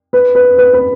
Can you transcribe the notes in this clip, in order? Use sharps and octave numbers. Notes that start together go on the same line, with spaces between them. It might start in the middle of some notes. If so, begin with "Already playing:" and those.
B4
B4
B4
B4